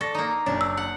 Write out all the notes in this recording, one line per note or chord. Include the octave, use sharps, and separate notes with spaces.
A4 D5 C#6 A#6
A#3 D#4
F#1 C#4 D4
E6
F#5